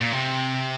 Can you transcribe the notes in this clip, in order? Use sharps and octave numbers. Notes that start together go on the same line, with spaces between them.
A#2
C3